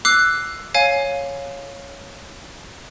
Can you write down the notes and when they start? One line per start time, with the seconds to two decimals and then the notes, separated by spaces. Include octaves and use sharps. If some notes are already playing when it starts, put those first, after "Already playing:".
0.05 D6 E6 F#6 C7
0.74 C#5 F5 G#5